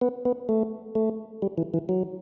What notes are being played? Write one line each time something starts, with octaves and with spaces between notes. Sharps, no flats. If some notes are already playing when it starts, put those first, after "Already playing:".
B3
B3
A3
A3
G3
E3
E3
F#3